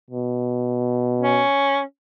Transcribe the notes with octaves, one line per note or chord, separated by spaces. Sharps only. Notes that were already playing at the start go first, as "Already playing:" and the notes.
B2
C#4